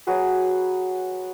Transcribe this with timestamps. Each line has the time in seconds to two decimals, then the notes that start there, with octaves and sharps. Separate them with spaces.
0.07 F#3 F#4 G#4 B4